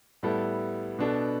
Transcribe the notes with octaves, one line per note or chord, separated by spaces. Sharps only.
A2 G3 B3 E4 A4
B2 B3 D4 A4